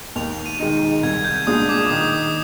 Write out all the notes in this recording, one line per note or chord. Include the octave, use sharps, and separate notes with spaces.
D#2 F7
D#7
D#3 G#3 D#4
C2 G#6
G6
A#2 G#3 D4 D#6
D6
D#3 D#6
D#6